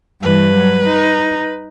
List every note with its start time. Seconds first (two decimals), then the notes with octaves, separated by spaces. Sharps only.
0.22 G2 E3 B4
0.54 F#3
0.86 D#4